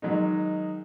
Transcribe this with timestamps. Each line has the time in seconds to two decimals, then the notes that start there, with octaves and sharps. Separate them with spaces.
0.02 D#3 F#3 G#3 D#4